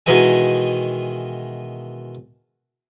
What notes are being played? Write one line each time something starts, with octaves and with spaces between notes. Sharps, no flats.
B2 D#3 E3 G#3 G#5